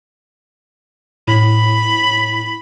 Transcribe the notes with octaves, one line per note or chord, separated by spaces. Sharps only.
A2 B5